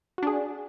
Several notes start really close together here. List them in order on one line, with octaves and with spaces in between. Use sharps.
F#4 D4 G#4